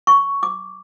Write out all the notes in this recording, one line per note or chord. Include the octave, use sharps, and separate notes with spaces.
C#6
D6